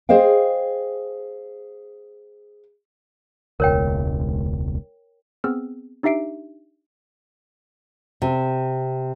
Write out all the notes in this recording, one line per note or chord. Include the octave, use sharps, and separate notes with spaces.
G#4 C5 D#5 F5 G5
E1 C#2 A#4 C#5 G5
B3 C4 G#4 E6 F6
D4 D#4 G4 E5 C7 D7
C3